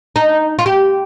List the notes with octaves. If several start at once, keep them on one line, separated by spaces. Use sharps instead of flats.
D#4
F4
G4